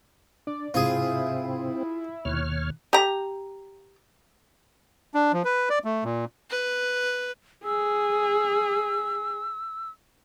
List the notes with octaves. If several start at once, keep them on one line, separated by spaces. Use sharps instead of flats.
D4 D5
G#2 C3 C4 E4 F4 G#4
D#2 B2 D#3 C#5 F6 F#6
G4 A#5
D4
F3
B4
D5
A3
A#2
B4
G#4 E6